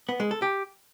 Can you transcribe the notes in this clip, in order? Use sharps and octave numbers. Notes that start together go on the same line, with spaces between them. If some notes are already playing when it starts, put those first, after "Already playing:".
B3
G#3
A4
G4